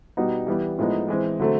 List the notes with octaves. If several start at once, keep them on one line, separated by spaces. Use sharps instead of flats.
B2 G3 B3 D#4 F#4
E3 G3 B3
A2 F3 G#3 B3 D#4
E3 G#3 C4
D3 F#3 A3 C4